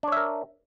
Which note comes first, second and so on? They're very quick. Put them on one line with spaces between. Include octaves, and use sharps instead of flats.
D4 C#5 E5 A#4